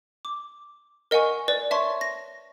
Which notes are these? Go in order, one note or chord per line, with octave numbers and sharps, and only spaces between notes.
D6
A#4 D#5 F#5 G#5 C#6
B4 D5
C#5 E5 A5 C6 C#6
A#6